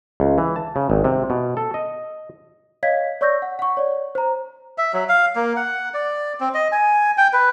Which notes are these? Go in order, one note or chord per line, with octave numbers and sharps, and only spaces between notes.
C#2
E3
A5
C#3
G#1
C3
B2
A4
D#5
C#5 D#5 F5 G#6 B6
C#5 D5 C#6 E6 G6 A#6
F#5
F#5 C#6
C#5 D5
C5 A#5
E5
F#3
F5
A#3
F#5
D5
C4
D#5
G#5
G5
B4